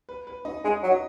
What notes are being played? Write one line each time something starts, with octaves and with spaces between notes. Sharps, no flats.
B4
B4
D#4 D#5
G#3 D#4 D#5
F#3
D#4 D#5